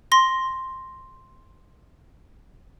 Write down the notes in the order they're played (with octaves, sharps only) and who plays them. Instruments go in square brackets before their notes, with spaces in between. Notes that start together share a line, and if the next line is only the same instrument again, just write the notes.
[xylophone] C6 A#6